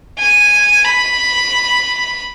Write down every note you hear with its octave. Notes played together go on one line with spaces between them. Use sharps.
G#5
B5